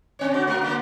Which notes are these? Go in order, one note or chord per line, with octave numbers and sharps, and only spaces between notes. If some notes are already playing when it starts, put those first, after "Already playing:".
C4 C#5
D3 F#4
A3 F#4 A#4
D3 A#3